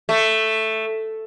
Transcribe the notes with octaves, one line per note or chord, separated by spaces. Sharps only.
A3